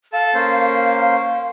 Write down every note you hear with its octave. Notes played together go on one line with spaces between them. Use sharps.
A4 F5 A5
A#3 C#4 C5